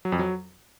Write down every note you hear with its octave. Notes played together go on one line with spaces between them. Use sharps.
F#3
F2
F#3